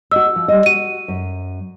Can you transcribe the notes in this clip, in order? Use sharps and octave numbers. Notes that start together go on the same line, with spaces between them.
F#4 D#5 E6
F3
G3 D#5
F#4 D#7
F#2